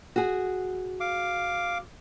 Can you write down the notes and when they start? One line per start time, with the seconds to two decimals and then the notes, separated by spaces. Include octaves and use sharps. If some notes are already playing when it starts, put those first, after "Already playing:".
0.16 F#4 G#4
1.00 F5 D6